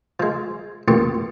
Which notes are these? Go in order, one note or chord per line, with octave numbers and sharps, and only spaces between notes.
F3 G#3
A1 E2 A#2 G4 C#6